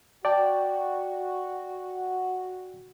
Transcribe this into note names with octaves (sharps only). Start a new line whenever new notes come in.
F#4 D5 G5 A5